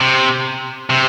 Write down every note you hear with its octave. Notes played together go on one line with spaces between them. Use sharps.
C3
C3